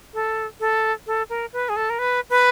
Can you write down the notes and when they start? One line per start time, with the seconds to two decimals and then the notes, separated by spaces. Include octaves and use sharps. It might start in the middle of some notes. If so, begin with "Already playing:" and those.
0.14 A4
0.60 A4
1.07 A4
1.30 A#4
1.53 B4
1.69 G#4
1.76 A4
1.90 A#4
1.99 B4
2.30 B4